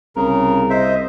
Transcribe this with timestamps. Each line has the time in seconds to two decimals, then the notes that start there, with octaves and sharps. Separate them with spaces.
0.16 C2 C#3 A#4
0.70 C5 D#5 E5